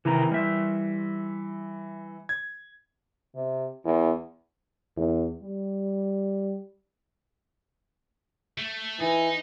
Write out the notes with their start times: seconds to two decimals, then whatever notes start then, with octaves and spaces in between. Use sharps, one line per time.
0.05 C3 D#3 E3 A#5
0.32 G3 E5
2.29 G#6
3.35 C3
3.85 E2
4.97 E2
5.42 G3
8.58 A3
9.00 E3 D#4